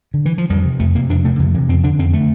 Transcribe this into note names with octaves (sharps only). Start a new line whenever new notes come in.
D3
E3
F3
F2 G3
C3
F2 A3
C3 A#3
F2 D4
C3 A3
F2 D3
C3 E3
F2 C4
D3 D4
F2 C4
D3 A3